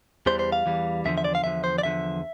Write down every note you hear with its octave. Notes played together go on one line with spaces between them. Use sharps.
E2 E3 G3 C5
C5
F5
E2 E3 G3
E2 D3 F3 E5
E5
D5
F5
E2 D3 F3 E5
C5
D5
E2 D3 F3 E5